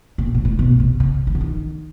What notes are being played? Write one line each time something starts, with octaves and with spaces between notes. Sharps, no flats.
A#2
A#2
A2
B2
C3
C#3
E3
D3
D#3